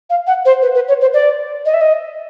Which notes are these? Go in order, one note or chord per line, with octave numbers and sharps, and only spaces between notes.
F5
F#5
C5
B4
B4
C#5
C5
D5
D#5
E5
D#5